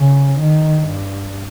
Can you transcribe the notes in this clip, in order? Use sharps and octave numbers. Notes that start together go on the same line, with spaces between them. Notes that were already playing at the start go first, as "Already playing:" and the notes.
Already playing: C#3
D#3
G2